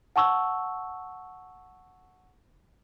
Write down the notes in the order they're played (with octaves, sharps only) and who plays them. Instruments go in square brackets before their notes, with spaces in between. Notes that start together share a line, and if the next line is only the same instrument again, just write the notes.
[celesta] F#5 A5 C#6 E6